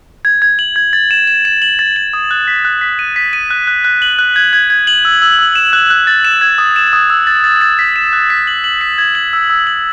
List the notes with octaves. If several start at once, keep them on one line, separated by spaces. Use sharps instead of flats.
G#6
G#6
F#7
G#6
A6
E7
E7
E7
F#7
A6
F#7
D#6
F#6
B6
F#6
B6
D#7
B6
D#7
F#6
F#6
F#6
F#7
F#6
G#6
G#6
G#6
F#7
E6
E6
E6
E7
F#6
F#6
A6
E7
G#6
D#6
E7
D#6
E6
A6
A6
A6
B6
E7
F#6
B6
F#7
F#7
B6
G#6
F#7
E6
E6
F#7